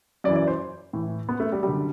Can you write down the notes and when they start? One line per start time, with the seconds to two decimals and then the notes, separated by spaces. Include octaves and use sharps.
0.24 F#2 D5
0.28 E3
0.36 D5
0.48 C5
0.93 A2 E3
1.29 B3
1.40 A3
1.52 G3
1.63 F#2 G3
1.68 D3